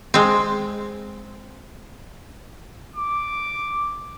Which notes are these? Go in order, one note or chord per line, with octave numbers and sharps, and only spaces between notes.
G#3 C4
D6